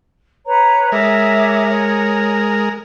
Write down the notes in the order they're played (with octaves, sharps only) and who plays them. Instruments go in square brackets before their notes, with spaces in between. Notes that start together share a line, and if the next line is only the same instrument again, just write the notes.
[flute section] B4 C#5 A#5
[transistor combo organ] G#3 A#4 [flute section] C#5 E5 D6
[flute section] C#5